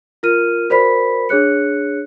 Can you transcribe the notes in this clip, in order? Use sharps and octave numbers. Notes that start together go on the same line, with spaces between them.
F4 A#4 F6 D#7
F#4 A#4 C5 D5 B5 B6
D4 G#4 C#5 F#6 C#7